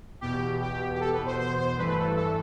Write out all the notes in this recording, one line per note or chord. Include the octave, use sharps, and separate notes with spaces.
E2 B2 B3 G4
G4
G4
A4
B4
C5
C5
C5
G2 E3 A3 B4
B4
A4
A4